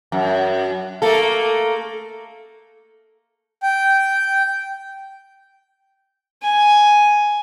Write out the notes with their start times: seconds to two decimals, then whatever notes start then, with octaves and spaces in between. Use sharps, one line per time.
0.12 F#2
1.02 A3 A#3 A4
3.63 G5
6.42 G#5